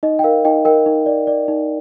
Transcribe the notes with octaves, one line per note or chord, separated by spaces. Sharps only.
D#4 D#5
G5
A#4 F5
D#4 D#5 G5
A#4 D#5 G5
D#4
D5
D5
D#4